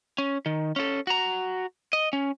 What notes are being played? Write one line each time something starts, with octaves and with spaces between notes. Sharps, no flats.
C#4
D#3
C#4 A4
F#4 A#5
D#5
C#4